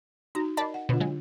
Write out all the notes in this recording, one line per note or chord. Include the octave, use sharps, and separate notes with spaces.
D#4 F#4 A#5
A#4 D5 D#5 A5 B5
F#5
B2 D3 B3 D4 F4
F#3 G#3